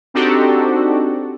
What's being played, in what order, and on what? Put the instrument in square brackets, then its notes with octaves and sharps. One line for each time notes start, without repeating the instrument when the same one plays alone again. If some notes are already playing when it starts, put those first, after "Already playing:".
[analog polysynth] C4 D4 D#4 F#4 G4 A4